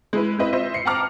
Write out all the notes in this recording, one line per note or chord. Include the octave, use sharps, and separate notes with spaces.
G#3 E4 B4
C4 E4 B4 D#5 E5
F4 C5 D#5 E5
C7 C#7
F#5 G5 A5 A#5 D6 F6